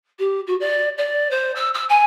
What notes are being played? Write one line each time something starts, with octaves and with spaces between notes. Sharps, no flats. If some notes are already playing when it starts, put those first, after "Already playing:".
G4
F#4
D5
D5
C5
E6
E6
G#5